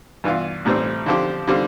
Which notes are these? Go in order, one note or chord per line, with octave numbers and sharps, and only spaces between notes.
G2 E3 B3 F4
A1 A2 G3 C4
D3 F3 C4 G4
D3 G3 C4 F4